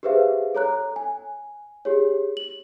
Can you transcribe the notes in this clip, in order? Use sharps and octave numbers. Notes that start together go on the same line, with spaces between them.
G4 G#4 B4 C5 E5 F5
A4 C#5 A#5 F#6
G#5
G4 G#4 C#5
F#7